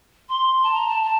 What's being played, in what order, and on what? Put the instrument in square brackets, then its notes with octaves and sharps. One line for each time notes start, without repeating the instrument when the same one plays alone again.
[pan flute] C6
A5
A#5
A5
A5